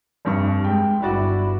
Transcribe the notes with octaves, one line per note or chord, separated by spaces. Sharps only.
F1 G2 C#6
G#3 G5
G1 D4 E4 F#4 D5